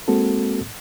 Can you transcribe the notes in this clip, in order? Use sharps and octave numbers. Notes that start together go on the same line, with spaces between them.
G#3 A#3 C4 F#4 A4